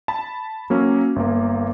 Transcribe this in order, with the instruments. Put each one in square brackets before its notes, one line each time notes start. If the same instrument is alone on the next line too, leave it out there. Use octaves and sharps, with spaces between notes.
[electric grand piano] A5 B5
F#3 A#3 C#4
G1 A#3